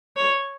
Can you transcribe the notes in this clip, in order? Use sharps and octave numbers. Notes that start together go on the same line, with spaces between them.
C#5